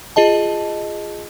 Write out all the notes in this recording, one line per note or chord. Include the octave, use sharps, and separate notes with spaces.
F4 G#4 D#5 A5